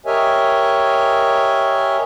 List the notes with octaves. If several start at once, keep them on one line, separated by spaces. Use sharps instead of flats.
G4 A#4 C#5 D#5 E5 G#5